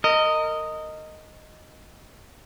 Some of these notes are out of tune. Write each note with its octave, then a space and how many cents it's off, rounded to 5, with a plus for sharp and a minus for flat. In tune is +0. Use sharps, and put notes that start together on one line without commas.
A#4 -25 D#5 +0